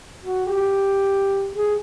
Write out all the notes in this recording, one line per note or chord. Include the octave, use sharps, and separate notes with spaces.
F#4
G4
G#4